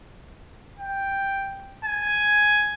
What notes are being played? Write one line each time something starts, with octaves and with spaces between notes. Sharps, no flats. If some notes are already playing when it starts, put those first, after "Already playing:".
G5
G#5